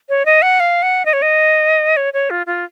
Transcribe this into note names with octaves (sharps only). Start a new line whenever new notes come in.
C#5
D#5
F#5
F5
F#5
D#5
C#5
D#5
C#5
C#5
F4
F4